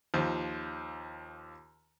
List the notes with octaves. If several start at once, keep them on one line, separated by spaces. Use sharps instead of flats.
D#2 F3